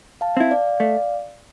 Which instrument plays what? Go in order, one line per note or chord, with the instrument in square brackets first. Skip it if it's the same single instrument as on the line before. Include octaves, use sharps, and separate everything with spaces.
[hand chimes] F5 A5
[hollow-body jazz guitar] C4 E4
[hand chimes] D5 F5
[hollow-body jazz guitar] A3 [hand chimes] D5 F5